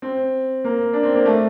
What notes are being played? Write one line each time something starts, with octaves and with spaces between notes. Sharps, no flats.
C4
A#3
D4
C4
A#3
A3